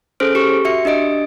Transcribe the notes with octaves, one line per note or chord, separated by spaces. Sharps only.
C#4 G#4 A4 C5 F6 D7
G4 C#6
F#4 E5 C#7
D4 G4 D#5 D7